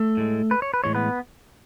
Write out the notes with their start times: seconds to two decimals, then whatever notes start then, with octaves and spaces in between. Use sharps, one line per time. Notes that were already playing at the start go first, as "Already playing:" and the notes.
Already playing: A3 A4
0.17 A2 G#3
0.51 B4
0.62 C#5
0.74 B4
0.84 A2 E3 G#3 C#5
0.95 B3 B4